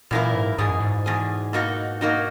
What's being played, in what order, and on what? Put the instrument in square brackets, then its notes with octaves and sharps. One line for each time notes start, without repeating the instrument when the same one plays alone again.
[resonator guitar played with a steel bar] F#2 E3 A#3 E4 A#4 [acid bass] A#2
[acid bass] G#2
[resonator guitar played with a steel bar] E2 B2 G#4 [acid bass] G#2
[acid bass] F#2
G#2
[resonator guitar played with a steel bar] E2 B2 G#4
B2 A#3 D#4 F#4
B2 A#3 D#4 F#4